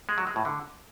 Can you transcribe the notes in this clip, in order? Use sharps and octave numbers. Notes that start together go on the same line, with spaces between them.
G#3
F#3
G#3
A2
D3